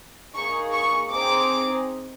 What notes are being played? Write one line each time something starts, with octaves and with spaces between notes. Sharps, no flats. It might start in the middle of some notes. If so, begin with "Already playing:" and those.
A#3 D#4 G#4 C#6
C#6
C4 D#4 G#4 D6